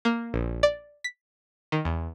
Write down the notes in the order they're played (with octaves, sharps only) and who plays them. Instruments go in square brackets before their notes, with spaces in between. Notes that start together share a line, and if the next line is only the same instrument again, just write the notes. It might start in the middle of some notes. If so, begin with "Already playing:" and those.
[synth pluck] A#3
A#1
D5
B6
D#3
E2